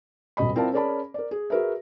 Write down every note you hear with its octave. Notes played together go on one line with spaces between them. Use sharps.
D#1 B2 D#5 B5
C4 E4 F4 A#4 D5 A5
C#4 G#4 A#4 D5 A5 B5
A#4 D5
G#4
F#4 G#4 A#4 B4 E5